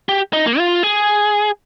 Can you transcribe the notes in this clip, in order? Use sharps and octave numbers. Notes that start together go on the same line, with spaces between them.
G4
D#4
A#3
F4
G#4